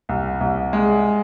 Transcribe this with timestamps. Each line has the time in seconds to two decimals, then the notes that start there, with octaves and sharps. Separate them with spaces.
0.09 C2
0.41 C2
0.73 G#3